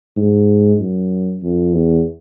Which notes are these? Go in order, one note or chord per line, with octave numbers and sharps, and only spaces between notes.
G#2
F#2
F2
E2